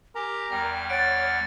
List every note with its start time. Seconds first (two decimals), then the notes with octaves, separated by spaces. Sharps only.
0.15 G4 A#4 G#5 A#5
0.51 E2 G3 G5 F6
0.90 C#5 F#5 A6 D7